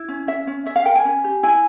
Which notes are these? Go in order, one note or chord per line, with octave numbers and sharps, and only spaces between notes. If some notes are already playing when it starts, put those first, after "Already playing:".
Already playing: E4
C#4
C#4 E5
C#4
C#4 E5
F5
A#4 G5
G#5
C#4
G4
E4 G#5